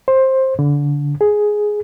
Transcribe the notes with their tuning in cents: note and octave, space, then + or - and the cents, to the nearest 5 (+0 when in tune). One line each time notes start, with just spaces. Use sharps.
C5 +15
D3 -25
G#4 +5